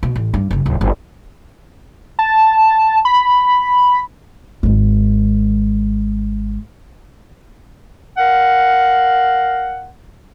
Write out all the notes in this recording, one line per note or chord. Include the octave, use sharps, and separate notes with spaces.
B2
A1
G2
F#1 C#3
D1
G1
A5
B5
G#1 G#3
A#4 F5 F#5